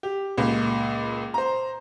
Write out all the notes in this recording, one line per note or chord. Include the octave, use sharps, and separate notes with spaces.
G4
C#2 A#2
C5 A#5